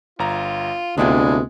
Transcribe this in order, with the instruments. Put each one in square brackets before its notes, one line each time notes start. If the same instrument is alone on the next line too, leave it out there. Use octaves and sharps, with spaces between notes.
[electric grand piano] G1 A#5 [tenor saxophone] F4
[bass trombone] D2 [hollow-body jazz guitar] C3 B3 G5 [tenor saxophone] G#3 [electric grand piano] D4 E4 F4